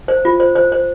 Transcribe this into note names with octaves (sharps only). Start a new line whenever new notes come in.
C5
F4
C5
C5
C5